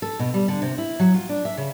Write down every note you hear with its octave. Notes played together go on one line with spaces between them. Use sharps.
A4
B2
G3
D3
C3
E4
F#3
F4
D4
E5
C#3